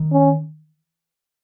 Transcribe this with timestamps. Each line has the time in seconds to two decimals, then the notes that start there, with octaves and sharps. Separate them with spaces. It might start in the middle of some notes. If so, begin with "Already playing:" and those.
Already playing: D#3
0.12 C#4